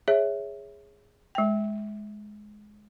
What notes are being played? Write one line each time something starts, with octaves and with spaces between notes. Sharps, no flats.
G#4 C#5 E5
G#3 G5